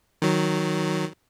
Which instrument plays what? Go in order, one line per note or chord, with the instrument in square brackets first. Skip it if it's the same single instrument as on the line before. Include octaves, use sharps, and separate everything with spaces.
[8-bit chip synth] D#3 F#3